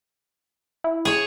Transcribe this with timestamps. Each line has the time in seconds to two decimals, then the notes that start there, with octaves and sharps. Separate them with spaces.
0.84 E4
1.05 G#4 C#5